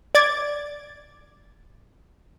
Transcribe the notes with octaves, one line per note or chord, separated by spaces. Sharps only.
D5 D6 G#6 A6